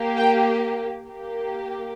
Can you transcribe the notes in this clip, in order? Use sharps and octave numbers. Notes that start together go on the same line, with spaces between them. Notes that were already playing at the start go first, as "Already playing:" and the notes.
Already playing: A#3 G4
G5
A#3 G4